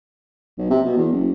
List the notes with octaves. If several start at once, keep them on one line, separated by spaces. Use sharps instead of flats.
B1
C3
B2
E2
F#1